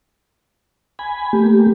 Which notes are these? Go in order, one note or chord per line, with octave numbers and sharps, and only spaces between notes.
G#5 B5
A3 A#3 G4